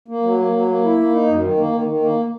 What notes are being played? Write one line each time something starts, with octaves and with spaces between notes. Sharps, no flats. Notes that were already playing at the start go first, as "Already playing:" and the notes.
A#3
F#3
A#3
F#3
A#3
E4
A#3
D#4
F#2
D#3
A#3
D#3
D#3
A#3